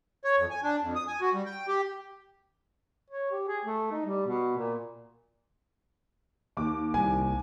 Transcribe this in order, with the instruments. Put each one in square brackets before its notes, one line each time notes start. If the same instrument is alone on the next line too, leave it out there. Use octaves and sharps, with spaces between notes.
[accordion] C#5
F2
G#5
D4
F2
D#6
G#5
F#4
G3
G5
G4
[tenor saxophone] C#5
G4
G#4
A3
D#4
G3
B2
A#2
[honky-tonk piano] D#2 D6
[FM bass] C2 [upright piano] G#5